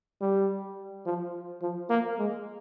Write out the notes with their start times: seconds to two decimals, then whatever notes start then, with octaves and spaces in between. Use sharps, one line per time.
0.21 G3
1.06 F3
1.62 F3
1.90 A#3
2.18 G#3